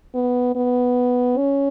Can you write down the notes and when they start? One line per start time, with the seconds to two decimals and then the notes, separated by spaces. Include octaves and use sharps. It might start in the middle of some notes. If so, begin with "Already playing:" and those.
0.15 B3
0.55 B3
1.38 C#4